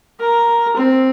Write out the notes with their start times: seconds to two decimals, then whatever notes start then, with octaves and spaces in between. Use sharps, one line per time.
0.20 A#4
0.77 C4